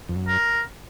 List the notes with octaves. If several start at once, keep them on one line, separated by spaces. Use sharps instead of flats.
F2
F#2
A#4